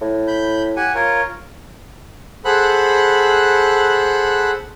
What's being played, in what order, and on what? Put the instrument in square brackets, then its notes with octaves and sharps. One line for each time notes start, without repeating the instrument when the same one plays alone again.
[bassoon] A2
[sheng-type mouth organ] B5 G6
G4 F#5 G#5
F4 A#4 C#5
G#4 A4 C5 F#5 B5 F#6